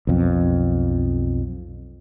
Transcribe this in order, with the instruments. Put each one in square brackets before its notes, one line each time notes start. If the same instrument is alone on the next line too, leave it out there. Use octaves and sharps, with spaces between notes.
[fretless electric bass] B1 F2